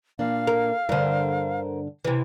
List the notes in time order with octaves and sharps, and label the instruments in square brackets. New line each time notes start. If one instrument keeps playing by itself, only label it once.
[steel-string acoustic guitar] A#2 A#3 D4 [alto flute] F5
[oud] A#4
[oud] G2 D3 [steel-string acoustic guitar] A#4 C5
[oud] C3 E3